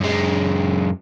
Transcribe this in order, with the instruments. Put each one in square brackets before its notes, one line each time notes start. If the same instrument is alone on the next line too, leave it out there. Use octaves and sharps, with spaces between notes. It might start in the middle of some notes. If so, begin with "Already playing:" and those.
[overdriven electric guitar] F#2 G#3